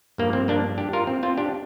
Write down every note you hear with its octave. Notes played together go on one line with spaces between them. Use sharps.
G2 F3 A#3
C4
A#3 D4
D4 G4
F4 A#4
C4
C4 F4
D4 G4